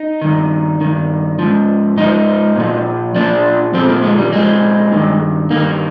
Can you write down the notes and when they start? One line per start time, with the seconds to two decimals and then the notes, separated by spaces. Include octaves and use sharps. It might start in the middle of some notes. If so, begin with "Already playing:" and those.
Already playing: D#4
0.22 G2 D#3
0.81 G2 D#3
1.39 G#2 F3
1.97 G#2 F3 D#4
2.56 A#2 F3
3.15 A#2 F3 D4
3.74 A#2 F3 C4
3.89 A#3
4.03 G#3
4.18 G3
4.33 A#2 F3 G#3
4.92 G2 D#3
5.50 G2 D#3 A#3